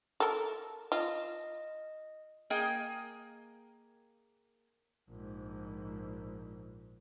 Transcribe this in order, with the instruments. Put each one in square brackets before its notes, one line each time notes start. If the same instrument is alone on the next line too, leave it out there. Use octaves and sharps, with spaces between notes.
[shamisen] A4 A#4
[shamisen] F4 [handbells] D#5
[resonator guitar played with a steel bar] A#3 G#4 D#5 G5
[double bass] A#1 G#2